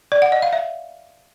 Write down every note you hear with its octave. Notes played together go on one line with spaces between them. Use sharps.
D5
F#5
D#5
F5
E5